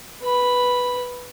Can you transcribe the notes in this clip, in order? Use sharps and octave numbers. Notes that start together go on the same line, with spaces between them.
B4 B5